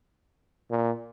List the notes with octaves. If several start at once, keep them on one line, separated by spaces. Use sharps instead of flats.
A#2